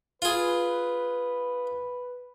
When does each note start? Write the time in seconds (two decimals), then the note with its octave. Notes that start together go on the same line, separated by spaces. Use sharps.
0.22 F4 G#4 B4